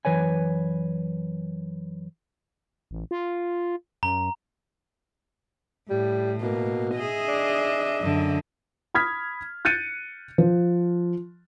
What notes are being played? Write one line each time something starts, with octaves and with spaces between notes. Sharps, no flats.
F#2 E3 B4 C#5 G#5
A1
F4
F#2 A#5
A2 G3
B2 A#3
G#4 D#5 E5
D4
F#2 D3
B5 D#6 F6 G#6 B6
F#6 G6 A6 C#7 D#7
F3